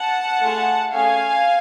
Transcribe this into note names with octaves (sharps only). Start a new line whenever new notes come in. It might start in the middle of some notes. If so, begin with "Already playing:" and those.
Already playing: F#5 A5
A3 F4 G#4
A3 C#4 G#4 F5 G#5